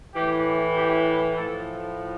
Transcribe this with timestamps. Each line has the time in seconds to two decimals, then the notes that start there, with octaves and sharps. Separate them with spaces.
0.15 A2 E3 G4
0.76 G4
1.36 A2 F3 A4